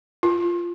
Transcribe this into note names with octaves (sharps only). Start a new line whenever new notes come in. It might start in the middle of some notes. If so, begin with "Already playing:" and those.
F4